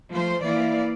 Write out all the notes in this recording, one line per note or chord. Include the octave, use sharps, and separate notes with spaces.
F3 A3 C5
E3 A#3 E4 D5 F5